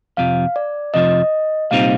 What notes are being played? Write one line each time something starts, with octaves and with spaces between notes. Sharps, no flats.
F2 C3 F3 F5
D5
F2 C3 F3 D#5
C2 A#2 G3 C4 D#4 F5